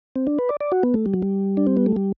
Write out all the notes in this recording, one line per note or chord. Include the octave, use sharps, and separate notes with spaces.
C4
D4
B4
D5
D5
F#4
B3
A3
G3
F#3
G3
D4
C4
B3
A3
G3